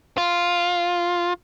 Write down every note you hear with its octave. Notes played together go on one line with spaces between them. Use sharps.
F4